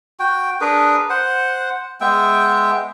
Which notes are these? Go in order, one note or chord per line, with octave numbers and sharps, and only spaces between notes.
F#4 G5
D4 G#4 A#4 B4
C5 F#5
G#3 B3 E5 G5